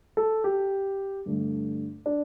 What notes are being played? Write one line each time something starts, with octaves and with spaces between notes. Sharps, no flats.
A4
G4
G2 D3 A3
D4